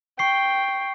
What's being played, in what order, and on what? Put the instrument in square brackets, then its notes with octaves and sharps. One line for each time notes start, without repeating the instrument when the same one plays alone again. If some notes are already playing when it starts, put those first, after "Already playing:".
[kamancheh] G5 [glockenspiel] C#6 C7